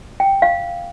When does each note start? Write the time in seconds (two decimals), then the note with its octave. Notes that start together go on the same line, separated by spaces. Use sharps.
0.20 G5
0.42 F5